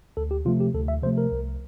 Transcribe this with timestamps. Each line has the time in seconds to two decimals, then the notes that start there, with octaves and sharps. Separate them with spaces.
0.17 D2 A4
0.31 G4
0.45 C3 F3 A3 F4
0.60 G4
0.74 D2 A4
0.88 E5
1.03 C3 F3 A3 C5
1.18 A#4
1.32 C2